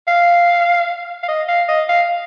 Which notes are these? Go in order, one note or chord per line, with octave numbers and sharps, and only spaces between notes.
F5
F5
D#5
F5
D#5
F5